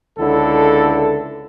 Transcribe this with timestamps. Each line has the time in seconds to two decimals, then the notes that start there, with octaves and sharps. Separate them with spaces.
0.17 C#2 D3 E4 A4